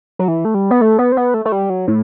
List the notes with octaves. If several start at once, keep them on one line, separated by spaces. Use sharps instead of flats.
F#3
E3
A3
G3
B3
A3
B3
C4
B3
A3
A3
G3
F#3
A2